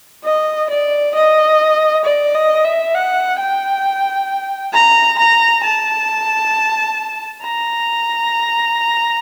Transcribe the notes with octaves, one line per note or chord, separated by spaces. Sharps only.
D#5
D5
D#5
D5
D#5
E5
F#5
G5
A#5
A#5
A5
A#5